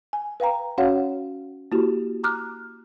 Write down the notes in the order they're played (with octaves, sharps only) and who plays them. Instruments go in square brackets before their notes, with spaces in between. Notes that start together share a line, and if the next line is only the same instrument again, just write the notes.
[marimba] G#5
B4 F5 G5 A#5
C#4 F#4 C#5 F5 F#5
A#3 E4 F#4 G4
A#5 D6 F6 F#6